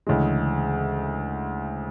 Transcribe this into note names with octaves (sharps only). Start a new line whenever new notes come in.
D2 C#3 E3 G#3